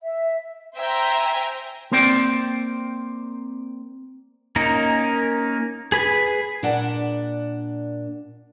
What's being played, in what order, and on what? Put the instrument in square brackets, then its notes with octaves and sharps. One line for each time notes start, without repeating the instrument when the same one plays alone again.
[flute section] E5
[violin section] C5 E5 G5 G#5 A#5
[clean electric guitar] A#3 C4 C5 D5 G5
[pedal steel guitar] A#3 C#4 D#4 A#4
G#4 B4 G#5
[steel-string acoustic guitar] A#2 D4 D5 F#5 A5